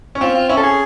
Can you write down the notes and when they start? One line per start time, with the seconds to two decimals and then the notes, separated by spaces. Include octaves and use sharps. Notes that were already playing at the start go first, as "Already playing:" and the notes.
0.15 C#4
0.21 C4 F4
0.35 F4
0.49 C#4 E4
0.57 A4
0.63 G#4